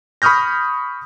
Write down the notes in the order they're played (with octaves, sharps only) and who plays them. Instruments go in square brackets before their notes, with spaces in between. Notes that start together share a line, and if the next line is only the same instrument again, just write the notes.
[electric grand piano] B5 C#6 D#6 F6 G6 A#6